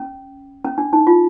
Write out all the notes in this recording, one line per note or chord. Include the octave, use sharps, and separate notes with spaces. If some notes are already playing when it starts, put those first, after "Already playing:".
Already playing: C#4
C#4
D4
D#4
F4